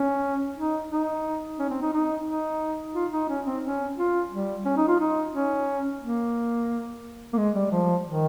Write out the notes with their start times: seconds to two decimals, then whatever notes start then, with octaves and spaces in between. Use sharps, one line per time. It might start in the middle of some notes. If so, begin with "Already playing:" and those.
Already playing: C#4
0.56 D#4
0.91 D#4
1.60 C#4
1.70 C4
1.82 D#4
1.93 D#4
2.27 D#4
2.95 F4
3.12 D#4
3.29 C#4
3.46 C4
3.63 C#4
3.98 F4
4.31 G3
4.65 C#4
4.77 D#4
4.88 F4
5.00 D#4
5.33 C#4
6.01 A#3
7.33 A#3
7.38 G#3
7.55 G3
7.72 F3
8.06 D#3